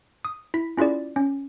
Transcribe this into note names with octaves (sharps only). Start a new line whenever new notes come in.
D#6
E4 B6
C#4 E4 F4 G#4 D5
C#4